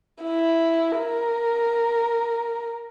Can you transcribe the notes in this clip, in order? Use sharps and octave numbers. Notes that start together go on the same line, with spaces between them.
E4
A#4